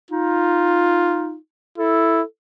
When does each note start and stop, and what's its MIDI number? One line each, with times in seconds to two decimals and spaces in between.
0.11 1.36 63
0.11 1.37 65
1.78 2.22 64
1.78 2.23 69